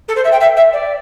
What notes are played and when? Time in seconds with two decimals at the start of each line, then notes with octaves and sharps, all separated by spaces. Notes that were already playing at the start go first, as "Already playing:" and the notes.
0.08 A4
0.16 C5
0.24 E5
0.32 G5
0.40 E5
0.56 E5
0.73 D5